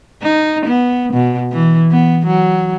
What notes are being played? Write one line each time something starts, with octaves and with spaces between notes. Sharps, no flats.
D#4
B3
B2
E3
B3
F#3